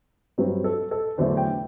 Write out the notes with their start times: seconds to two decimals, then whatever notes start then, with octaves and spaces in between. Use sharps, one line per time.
0.38 G2 F#3 C4 B4
0.64 A4
0.91 A4
1.18 E2 D3 F#3 A3 C5
1.37 G5